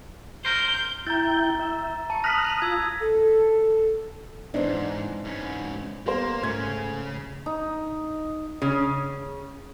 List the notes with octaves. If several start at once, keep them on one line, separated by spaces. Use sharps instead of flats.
A#4 C5 G6
E4 G5 A#5 G6 A6
E5
A5 C#6
D#6 F6 F#6 A#6 B6
F4 D#6 E6 G#6
A4
F2 G#2 E3 C4 D4 D#4
G#2 C#4
G3 A#3 B3 C5
G#2 C#3 A3 C#4 G#6
D#4
C#3